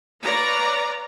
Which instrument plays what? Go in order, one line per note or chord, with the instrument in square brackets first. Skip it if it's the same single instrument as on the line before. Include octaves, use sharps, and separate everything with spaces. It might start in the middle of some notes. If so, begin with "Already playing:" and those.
[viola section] B4 C#5 D5 F5 A#5